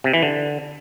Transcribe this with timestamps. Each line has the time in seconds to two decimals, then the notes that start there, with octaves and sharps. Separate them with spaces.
0.04 C3
0.13 E3
0.23 D3